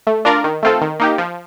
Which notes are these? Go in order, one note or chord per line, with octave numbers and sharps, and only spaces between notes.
A3
D4 F4 A#4 D5
D#3
A3 C4 F4 A4
D#3
A#3 D#4 G4
F3